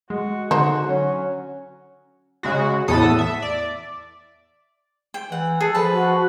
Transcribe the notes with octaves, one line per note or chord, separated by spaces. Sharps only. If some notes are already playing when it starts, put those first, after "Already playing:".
G#3 F#4
D3 D#4 F#4 C5
F#3 C#4
C#3 G#3 F#4
E2 A2 B3 A4 D#6
E5
D5
G5
E3 F#5
G#4 A4
F3 B4 A5
F#4